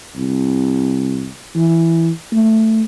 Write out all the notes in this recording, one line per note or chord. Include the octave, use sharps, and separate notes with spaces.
C2
E3
A3